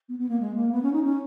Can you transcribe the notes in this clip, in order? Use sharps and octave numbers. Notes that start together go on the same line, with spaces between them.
B3
B3
A#3
G#3
A#3
B3
C#4
D#4
C#4